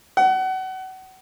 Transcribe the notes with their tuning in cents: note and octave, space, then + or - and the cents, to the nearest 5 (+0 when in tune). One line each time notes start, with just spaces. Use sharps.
F#5 +30